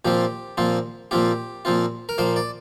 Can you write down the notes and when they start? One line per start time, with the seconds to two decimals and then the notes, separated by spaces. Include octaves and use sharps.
0.05 A#2 F3 C4 F4 G4
0.58 A#2 F3 C4 F4
1.11 A#2 F3 C4 F4 G4
1.65 A#2 F3 C4 F4
2.09 A#4
2.18 A#2 F3 A#3 C5
2.36 D5